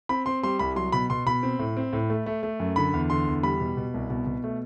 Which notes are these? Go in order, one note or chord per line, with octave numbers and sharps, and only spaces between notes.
C4 B5
C4 C6
G3 C6
C2 B5
F#3 C6
B2 B5
B2 C6
B2 B5
C4
A2
C4
A2
A3
A3
A3
F#2
D3 B5
E2
D3 C6
E2
G3 B5
B2
B2
C2
B2
B2
A3